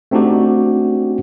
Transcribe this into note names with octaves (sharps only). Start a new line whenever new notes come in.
A3 C4 D4 D#4 F#4 G4